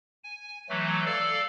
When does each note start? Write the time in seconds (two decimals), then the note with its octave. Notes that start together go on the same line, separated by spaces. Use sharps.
0.24 G#5
0.69 E3 F#3 A3
1.06 A4 D5 F5